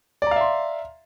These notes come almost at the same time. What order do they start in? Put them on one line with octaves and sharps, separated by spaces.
D5 A#5 F5 E5 C6